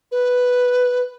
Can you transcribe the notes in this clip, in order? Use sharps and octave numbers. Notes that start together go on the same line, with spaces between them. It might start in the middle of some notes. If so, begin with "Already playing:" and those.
B4